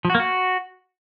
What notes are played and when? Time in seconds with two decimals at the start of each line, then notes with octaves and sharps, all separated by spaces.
0.05 F3
0.10 F#4
0.15 A#3
0.20 F#4